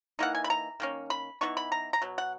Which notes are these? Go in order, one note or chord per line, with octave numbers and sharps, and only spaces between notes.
E3 A#3 D#4 F#5
G#5
B5
A#5
D#3 A#3 C#4
B5
E3 B3 D#4 C#6
B5
A#5
A#5
B2 F#3
F#5